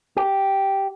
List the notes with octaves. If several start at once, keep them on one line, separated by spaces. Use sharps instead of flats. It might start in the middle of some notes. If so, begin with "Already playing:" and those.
G4